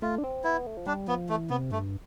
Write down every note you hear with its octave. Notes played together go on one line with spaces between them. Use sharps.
A3 F4
D4
C4
B3 E4
A3
F3
G3 D4
F3 B3
E3 A3
C3 B3
G2 A3